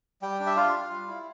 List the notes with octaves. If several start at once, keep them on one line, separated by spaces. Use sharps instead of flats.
G3 G5
D4
E5
F4 F5
F4
G3
E4